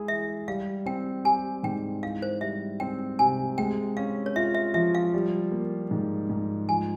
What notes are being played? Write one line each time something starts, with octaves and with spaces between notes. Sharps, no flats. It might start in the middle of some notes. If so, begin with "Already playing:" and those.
Already playing: G#3 E4 G#4
E3 E5
G3 F5
C4 G5
G4 G#5
G#2 G5
E3 F5
C5
G3 E5
C4 G5
C3 G#5
G#3 G5
C#4 F5
C#5
F4 E5
E5
F3 E5
F5
G3
A#3
G#2
G#2
F3 G#5